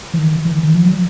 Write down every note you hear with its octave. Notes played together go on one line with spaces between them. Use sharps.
E3
D#3
E3
D#3
D#3
F3
F#3